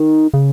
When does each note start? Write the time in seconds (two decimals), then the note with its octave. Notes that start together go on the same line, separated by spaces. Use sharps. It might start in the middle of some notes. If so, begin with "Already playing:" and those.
Already playing: D#3
0.34 C#3